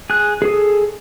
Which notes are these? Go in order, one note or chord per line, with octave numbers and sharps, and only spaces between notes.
G#4 F#6
G#4 A4 D#6